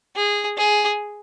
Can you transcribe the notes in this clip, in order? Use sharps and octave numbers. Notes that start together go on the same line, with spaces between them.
G#4
G#4